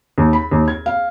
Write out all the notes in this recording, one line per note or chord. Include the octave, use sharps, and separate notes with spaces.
D#2
B5
D#2
G#6
F5